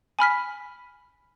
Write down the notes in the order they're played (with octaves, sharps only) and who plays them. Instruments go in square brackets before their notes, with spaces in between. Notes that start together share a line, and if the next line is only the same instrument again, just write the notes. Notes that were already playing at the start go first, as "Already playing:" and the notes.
[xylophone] G#5 B5 F6 B6